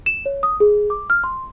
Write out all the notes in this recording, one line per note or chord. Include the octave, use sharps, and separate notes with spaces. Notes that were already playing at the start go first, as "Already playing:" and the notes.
E7
C#5
D#6
G#4
D6
F6
C6